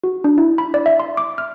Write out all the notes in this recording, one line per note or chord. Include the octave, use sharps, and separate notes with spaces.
F#4
D4
E4
B5
D5
E5
C6
D6
F6